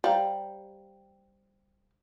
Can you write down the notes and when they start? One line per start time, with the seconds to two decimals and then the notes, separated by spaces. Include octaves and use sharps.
0.04 G3 C5 F5 G5 A#5